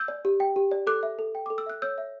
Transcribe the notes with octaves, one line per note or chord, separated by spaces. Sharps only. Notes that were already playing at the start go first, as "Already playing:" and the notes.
Already playing: E6 G6
D5
G4
G5
G4
D5
A4 D6 F#6
E5
A4
G5
A4 D6
E6
E5 F#6
C#5 E6 G6
E5